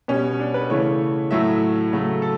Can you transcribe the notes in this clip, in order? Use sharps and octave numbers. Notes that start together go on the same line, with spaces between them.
B2 G3 C#4
D4
B4
C#3 E3 A3 C#5
A2 F#3 A3 E5
C#3 F#3 A3
A4